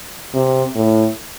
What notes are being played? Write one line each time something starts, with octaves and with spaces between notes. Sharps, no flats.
C3
A2